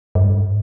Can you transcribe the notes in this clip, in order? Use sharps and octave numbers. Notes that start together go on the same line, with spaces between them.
G2
G#2